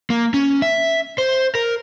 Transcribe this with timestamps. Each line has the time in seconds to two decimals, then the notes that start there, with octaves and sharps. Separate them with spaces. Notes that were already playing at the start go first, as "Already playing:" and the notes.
0.10 A#3
0.34 C#4
0.62 E5
1.18 C5
1.55 A#4